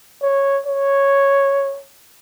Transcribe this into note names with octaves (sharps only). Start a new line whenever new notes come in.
C#5
C#5